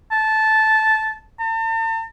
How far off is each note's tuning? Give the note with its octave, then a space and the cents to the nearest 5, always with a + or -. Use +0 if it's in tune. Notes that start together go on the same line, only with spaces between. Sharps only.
A5 -10
A5 +45